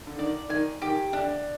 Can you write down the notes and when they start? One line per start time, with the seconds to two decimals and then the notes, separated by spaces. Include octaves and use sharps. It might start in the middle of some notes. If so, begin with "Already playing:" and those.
0.07 D3
0.18 D#3 D5
0.49 D#3 G#5
0.82 D#3 G4
1.13 D3 D4